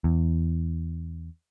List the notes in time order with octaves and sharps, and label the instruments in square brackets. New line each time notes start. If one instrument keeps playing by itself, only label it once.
[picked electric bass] E2